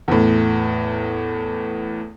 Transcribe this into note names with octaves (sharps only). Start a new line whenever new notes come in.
E2 A2